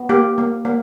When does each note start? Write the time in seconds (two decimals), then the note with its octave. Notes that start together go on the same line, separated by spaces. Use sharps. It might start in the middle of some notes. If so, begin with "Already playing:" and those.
Already playing: B3
0.09 A#3 G4
0.38 A#3
0.65 A#3